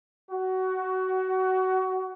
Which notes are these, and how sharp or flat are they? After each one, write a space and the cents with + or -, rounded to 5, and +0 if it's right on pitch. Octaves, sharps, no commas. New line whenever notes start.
F#4 +20